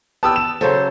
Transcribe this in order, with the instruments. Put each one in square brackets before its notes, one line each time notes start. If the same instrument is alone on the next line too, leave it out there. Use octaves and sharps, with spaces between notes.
[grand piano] B3 G4 [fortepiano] A5 D#6 E6
[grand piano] E7
[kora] C#3 F#3 A4 [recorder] C5